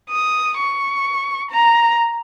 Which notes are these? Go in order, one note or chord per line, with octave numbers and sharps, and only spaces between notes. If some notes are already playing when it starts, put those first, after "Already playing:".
D#6
C#6
A#5